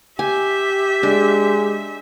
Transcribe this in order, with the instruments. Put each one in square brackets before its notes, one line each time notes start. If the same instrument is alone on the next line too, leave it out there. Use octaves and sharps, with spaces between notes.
[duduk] G4 [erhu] E5 [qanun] G#5
[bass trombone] G#3 [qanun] D4